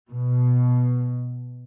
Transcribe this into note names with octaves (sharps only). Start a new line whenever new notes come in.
B2